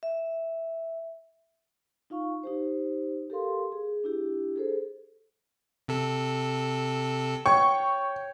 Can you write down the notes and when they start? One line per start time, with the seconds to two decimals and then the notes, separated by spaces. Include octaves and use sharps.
0.03 E5
2.10 D#4 F4 F5 C#6
2.43 D#4 G4 C5
3.30 G4 A4 A#4 F5 C6
3.72 G#4
4.04 D4 E4 G4
4.56 G#4 A4 C5
5.88 C3 A4
7.46 C#5 G5 C#6